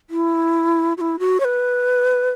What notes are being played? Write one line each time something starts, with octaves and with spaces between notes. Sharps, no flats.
E4
F#4
E4
F#4
C#5
B4